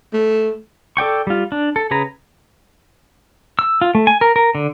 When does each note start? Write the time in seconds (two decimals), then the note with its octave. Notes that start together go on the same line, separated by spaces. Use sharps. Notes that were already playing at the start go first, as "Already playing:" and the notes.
0.13 A3
0.97 A4 D5 G5 C#6
1.27 G3 F4
1.52 D4
1.76 A4
1.91 C#3 G#4 B4 A#5
3.59 E6
3.81 F4
3.95 A3
4.07 G#5
4.21 A#4
4.36 A#4
4.55 D3